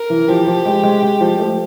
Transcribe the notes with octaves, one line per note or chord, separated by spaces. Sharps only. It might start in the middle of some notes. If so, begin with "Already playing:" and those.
Already playing: A#4
E3
F3 G4
F3
G#3
G#3
G#3
F3
A3